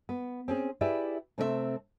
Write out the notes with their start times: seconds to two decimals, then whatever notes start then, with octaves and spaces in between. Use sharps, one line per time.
0.09 B3
0.48 C4 C#4 G#4
0.81 E4 G4 G#4 B4 D5 E5
1.38 C3 A3 C4 A4 D5 E5